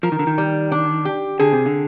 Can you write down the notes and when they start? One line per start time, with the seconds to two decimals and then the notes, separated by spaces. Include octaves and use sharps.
0.03 F3 A#4
0.12 D#3
0.19 D3
0.27 D#3
0.38 G3
0.72 D4
1.05 G4
1.40 D3 G#4
1.53 C3
1.66 D3